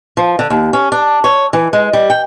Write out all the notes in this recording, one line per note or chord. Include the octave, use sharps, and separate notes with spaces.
F3
D3
D#2
C#4
D4
C#5
E3
G#3
G3
G5